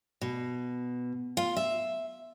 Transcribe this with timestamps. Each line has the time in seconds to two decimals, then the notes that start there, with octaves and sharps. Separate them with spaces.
0.21 B2
1.37 F4
1.57 E5